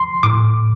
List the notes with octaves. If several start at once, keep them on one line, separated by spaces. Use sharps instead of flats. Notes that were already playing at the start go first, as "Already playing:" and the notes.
Already playing: C6
A2 D6